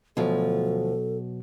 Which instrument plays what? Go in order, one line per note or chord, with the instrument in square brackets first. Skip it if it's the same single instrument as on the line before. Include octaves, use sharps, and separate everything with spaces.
[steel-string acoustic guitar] D2 F3 [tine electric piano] B2 F#3 [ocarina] A4